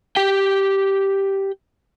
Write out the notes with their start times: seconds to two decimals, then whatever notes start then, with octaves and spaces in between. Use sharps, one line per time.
0.16 G4 G5